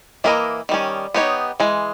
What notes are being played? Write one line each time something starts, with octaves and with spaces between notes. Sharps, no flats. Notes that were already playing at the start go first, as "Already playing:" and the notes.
E3 A#3 E4 A#4 D#5
D#3 G3 C#4
B3 D#4 G4 C#5
E3 G#3